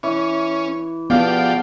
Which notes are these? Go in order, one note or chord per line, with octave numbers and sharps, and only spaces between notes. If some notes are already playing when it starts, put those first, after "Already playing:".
E3 C#4
F3 B3 G4 G#4 D5 F5 A5